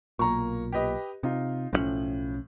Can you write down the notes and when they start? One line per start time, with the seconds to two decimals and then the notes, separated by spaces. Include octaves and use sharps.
0.19 B1 A#2 A#3 A#5 C#6
0.72 G4 B4 D#5
1.23 C3 D#4 F4
1.73 B1 A2 E3 F3 C#4 F#7